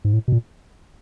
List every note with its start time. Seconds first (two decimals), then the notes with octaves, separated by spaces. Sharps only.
0.05 G#2
0.13 A2
0.28 B2
0.32 A#2